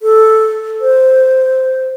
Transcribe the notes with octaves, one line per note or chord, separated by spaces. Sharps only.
A4
C5